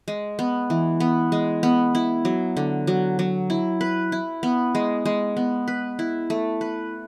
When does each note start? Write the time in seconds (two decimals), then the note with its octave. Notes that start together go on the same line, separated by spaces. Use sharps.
0.08 G#3
0.39 B3
0.70 E3
1.00 B3
1.32 G#3
1.63 B3
1.95 E4
2.25 F#3
2.57 D3
2.87 F#3
3.19 F#3
3.50 E4
3.81 B4
4.12 E4
4.43 B3
4.75 G#3
5.05 G#3
5.37 B3
5.68 B4
5.99 E4
6.30 A3
6.61 B4